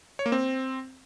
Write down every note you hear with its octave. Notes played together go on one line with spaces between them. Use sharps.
C#5
A#3
C4